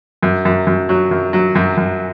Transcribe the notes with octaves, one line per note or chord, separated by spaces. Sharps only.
F#2
F#2
F#2
F#3
F#2
F#3
F#2
F#2